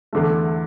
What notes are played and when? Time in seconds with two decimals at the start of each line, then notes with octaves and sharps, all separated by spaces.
0.13 E2 D3 A3